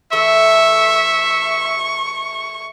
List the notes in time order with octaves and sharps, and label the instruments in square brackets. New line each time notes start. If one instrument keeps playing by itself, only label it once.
[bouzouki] E3 A3 A4 [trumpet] E5 [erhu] C#6